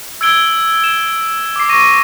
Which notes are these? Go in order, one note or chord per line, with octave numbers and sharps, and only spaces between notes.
E6 G#6 D7 G7
E7
D6 C7
C#6 A#6 D#7